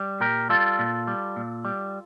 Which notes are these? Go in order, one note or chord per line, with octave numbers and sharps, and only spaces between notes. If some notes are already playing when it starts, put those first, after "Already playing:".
Already playing: G3
A#2 G4 A#4
G3 F4 A4
A#2
G3
A#2
G3